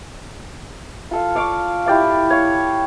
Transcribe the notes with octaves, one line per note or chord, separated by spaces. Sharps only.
F4 A4 F5
D5 F5 C#6 D6
E4 G4 D5 F5
C#5 F5